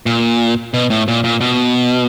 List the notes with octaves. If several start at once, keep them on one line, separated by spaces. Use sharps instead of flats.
A#2
B2
A2
A#2
A#2
B2